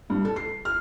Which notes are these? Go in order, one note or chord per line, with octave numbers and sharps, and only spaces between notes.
G2
A4
C7
F6